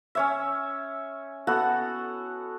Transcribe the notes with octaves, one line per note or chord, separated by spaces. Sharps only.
C#4 C#5 E5
B3 F#4 A4 F#5